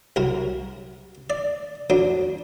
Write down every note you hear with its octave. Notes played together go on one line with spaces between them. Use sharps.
C2 F#2 A#4
D5
F2 F#3 D4